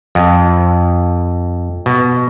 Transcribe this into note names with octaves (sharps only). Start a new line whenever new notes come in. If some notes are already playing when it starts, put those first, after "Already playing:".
F2
B2